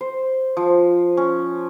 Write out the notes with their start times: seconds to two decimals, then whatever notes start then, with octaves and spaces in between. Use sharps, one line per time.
0.01 C5
0.57 F3
1.17 C#4